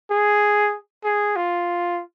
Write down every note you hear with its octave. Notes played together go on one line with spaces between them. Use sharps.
G#4
G#4
F4